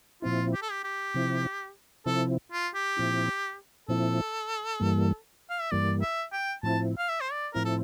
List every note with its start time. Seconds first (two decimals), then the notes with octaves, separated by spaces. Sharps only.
0.22 A#2 F3 C4 E4 F4
0.54 G4
0.62 A4
0.71 G4
0.84 G4
1.14 C3 F3 C4 E4
2.06 C3 F3 C4 E4 A4
2.52 F4
2.75 G4
2.97 A#2 F3 C4 E4
3.88 A#2 F3 C4 E4 A4
4.80 G2 E3 G3 A#3
5.50 F5
5.61 E5
5.71 G2 E3 G3 A#3 D5
6.02 E5
6.33 G5
6.63 A2 F3 C4 E4 A5
6.98 F5
7.09 E5
7.21 C5
7.32 D5
7.54 A2 F3 C4 E4 A#4
7.65 A4